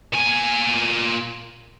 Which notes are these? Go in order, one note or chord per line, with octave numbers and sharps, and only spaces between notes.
A#2 G#5